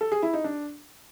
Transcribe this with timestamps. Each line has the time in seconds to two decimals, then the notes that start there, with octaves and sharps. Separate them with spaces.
0.01 A4
0.12 G#4
0.22 E4
0.33 D#4
0.44 D4